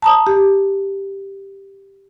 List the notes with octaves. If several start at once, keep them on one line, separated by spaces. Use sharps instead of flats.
A5 A#5 D#6
G4